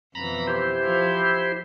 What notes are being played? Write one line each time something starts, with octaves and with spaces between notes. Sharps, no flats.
F2 B2 E3 A#5 B5
E4 G4 C5
F3